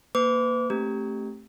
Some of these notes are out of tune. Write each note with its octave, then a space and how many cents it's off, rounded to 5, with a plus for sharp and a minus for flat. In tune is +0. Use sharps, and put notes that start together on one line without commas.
A#3 +0 B4 +35 D6 -25
A3 +0 C4 +35 G4 +0